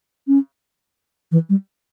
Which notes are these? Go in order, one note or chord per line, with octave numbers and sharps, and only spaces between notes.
C#4
E3
G3